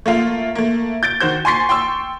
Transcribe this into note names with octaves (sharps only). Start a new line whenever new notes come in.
A3 A#3 F4
A3 A#3
G6 A6 D7
D#3 F#4 C5 G6
G#5 C6 C#6 A6 C7
G5 C6 C#6 E6